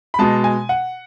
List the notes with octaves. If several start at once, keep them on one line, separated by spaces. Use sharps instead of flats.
B5
B2 G#3 A5
G#5
F#5